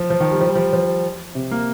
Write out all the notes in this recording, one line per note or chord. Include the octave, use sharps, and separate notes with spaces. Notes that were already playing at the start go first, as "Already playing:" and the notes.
Already playing: F3
F3
D#3
G3
F3
G3
F3
F3
C3
A#3